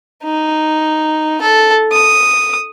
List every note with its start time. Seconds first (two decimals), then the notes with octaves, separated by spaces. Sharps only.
0.24 D#4
1.41 A4
1.92 D#6